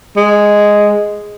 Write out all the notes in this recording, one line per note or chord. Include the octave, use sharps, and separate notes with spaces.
G#3